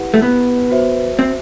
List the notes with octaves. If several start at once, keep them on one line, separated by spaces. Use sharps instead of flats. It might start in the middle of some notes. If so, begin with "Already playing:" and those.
Already playing: E4 G4 B4 F#5
A3
B3
F#4 C5 E5
C4